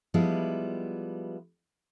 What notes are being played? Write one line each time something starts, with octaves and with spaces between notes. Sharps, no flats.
F3 G3 G#3 B3 E4